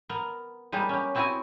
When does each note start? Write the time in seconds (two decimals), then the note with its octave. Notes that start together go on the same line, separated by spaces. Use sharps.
0.09 B3 A#4
0.72 G3 G#3 A#3 B3 G4
0.89 C#4 G4
1.15 B3 C4 E4 F#4 D#5 G#5